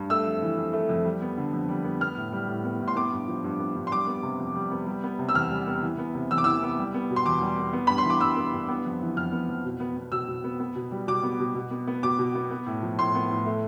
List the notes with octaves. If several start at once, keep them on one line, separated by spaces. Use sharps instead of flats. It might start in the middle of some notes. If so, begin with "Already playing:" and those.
Already playing: G2
A3 E6
F2
E3
F2
A3
F2
G3
B3
D3
F2
G3
B3
B3 F6
A2
G3
A2
B3
A2
C6
B3 D6
G2
F3
G2
B3
G2
C6
G3 D6
B3
C3
F2
G3
B3
G3
B3
C3
E6
E2 F6
G3
B3
E3
B3
C3
E2 E6
D6
E3 E6
B3
G3
B3
B2
C6
E2 D6
G3
B3
B3
G2 B5
C6
E3
D6
G2 E6
B3
G2
B3
F2
E3
F2 F6
B3
F2
B2
B3
B3
B2 E6
B2
B3
B3
B2
G3
B2 D6
B3
B2
B2
B3
B3
B2 D6
B2
B3
B3
A2
F3
A2 C6
B3
A2
A3